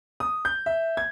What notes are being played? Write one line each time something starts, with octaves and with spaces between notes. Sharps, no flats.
D#6
G6
E5
G#6